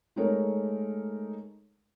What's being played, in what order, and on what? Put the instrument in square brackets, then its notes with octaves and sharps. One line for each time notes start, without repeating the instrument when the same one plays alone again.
[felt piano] G#3 A3 D#4 A#4 C#5